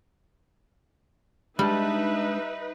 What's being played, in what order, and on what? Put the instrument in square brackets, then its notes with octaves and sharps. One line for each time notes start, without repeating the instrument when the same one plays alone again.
[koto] G3 [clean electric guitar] G#3 D4 A5 [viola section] D#4 B4 [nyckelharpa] E5